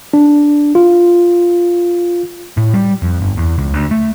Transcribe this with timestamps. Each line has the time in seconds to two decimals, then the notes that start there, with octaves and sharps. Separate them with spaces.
0.14 D4
0.75 F4
2.57 A2
2.74 G3
3.02 F2
3.21 G1
3.37 E2
3.58 C#2
3.74 D2
3.91 A3